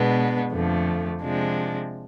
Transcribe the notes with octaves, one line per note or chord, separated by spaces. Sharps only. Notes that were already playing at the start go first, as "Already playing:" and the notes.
Already playing: B2 G#3 B3 D4
F2 D3 F3 A3
C3 F3 G#3 D4